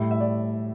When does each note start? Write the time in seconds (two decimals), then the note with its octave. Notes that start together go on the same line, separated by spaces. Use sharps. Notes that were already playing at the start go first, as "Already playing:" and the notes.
Already playing: A2 G3
0.11 E5
0.20 D5